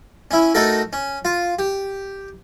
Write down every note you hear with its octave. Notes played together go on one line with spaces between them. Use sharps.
C#4 E4
A3 D#4 F#4 A4 A#4
C#4
F4
G4